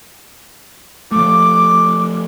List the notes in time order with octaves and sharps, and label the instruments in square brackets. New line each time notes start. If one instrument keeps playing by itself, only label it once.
[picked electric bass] F3 A3 [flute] D6